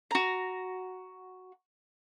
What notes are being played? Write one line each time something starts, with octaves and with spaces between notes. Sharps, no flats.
F#4 A#5